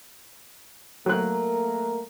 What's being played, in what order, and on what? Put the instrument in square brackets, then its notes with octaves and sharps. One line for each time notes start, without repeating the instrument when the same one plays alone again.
[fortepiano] F#3 F#6 [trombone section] A3 A#3 A#4